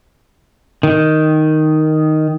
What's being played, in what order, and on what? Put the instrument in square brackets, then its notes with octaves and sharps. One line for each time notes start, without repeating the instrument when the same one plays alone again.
[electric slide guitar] D#3